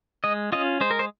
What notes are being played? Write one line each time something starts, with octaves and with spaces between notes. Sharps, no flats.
G#3 D#5
C#4 F4 D#5
G#3 C5
A#4
C5